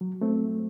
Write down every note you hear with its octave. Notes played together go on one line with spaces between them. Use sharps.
F#3
A3 C4